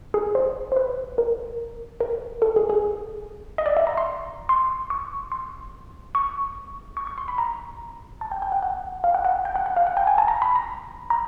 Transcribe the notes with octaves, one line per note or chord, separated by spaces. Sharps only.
G#4
C5
C5
B4
A#4
A#4
A4
G#4
G#4
D#5
D5
E5
A#5
C6
C6
C#6
C6
C#6
C#6
C#6
C6
B5
A#5
A5
G5
G5
F#5
F#5
F5
F#5
F#5
G5
F#5
F#5
F5
F#5
G5
G#5
A5
A#5
B5
A#5
A#5